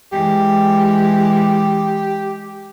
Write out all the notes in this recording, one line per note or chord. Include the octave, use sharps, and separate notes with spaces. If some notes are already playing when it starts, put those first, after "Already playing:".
E3 G#3 G4